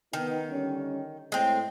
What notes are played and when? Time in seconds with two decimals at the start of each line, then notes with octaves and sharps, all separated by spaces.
0.13 D#3 B3 D#4
0.50 D3 G3 C#4
1.32 A2 G#3 C4